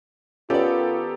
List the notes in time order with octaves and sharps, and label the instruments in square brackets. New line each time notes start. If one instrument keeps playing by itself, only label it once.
[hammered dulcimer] D#3 B3 [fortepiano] C#4 D5 [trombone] F4 [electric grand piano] G4 A4